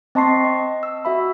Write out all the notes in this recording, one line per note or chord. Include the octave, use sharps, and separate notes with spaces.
C4 D#5 A5 C6 C#6 C7
D#5
E6
F#4 E5 B5